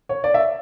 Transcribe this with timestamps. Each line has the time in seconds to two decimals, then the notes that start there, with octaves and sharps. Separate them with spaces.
0.09 C#5
0.24 D5
0.34 E5